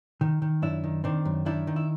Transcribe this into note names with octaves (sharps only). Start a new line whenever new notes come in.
D#3
D#3
F#2 D4 E4
D#3
D#3 C4 D4
F#2
D#3 D4 E4
D#3
E4